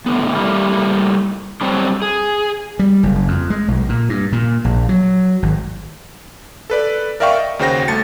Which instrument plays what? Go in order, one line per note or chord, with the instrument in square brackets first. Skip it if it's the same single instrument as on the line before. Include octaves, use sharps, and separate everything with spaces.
[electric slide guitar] A2 D3 B3
G3 A3 A#3 E4 G4
F#3 G3 C4 D4
G#4
[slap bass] G3
F#1
F2
G#3
B1
A#2
G2
A#2
A#1
F#3
G#1
[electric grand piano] A4 B4 D5
A#4 D5 E5 F5 G5 C#6
D#5
D#2 C#3 F#4 C5 G5 A#6
G1 A3 A5 A6 C#7